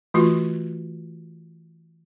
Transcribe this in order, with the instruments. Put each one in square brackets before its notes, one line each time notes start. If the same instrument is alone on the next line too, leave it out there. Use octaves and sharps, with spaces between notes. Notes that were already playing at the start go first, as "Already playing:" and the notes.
[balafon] E3 A3 F4 F#4